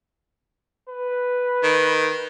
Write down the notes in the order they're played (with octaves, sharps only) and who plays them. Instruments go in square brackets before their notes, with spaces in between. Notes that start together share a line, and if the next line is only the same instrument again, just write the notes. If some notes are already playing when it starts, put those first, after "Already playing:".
[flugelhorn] B4
[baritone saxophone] D#3